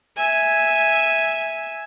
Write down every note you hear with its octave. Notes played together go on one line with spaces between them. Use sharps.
E5 G#5